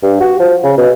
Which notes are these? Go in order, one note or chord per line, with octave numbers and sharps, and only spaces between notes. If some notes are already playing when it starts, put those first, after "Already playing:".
G2
F#4
F3
C#3
B2